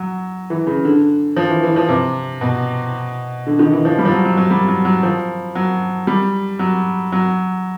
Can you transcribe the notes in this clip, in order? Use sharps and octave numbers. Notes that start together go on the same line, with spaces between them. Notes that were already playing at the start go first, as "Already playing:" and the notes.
Already playing: F#3
E3
C#3
D3
F3
E3
E3
F3
C3
B2
D3
D#3
E3
F3
G3
F3
F#3
F#3
F#3
G3
F#3
F#3
F3
F#3
G3
F#3
F#3